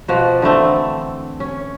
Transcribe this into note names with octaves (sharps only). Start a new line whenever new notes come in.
B2 F3 F#4
D3 E3 A3 C4
C#4